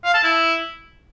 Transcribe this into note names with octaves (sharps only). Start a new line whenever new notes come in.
F5
A5
E4